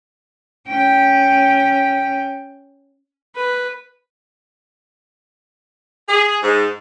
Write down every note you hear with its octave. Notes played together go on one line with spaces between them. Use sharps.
C#4 G5
B4
G#4
G#2